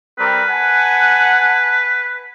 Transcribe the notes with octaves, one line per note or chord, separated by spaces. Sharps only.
G3 C4 A#4 B4
F#5 G#5 A5